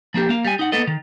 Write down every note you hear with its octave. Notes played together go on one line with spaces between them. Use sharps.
F3 A#3 D4 G4
A#3 F5
G3 G#5
D#4 F#5
A#3 B3 A4 D#5
D#3